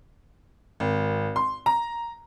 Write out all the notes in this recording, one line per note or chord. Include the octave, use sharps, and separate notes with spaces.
G#1
C6
A#5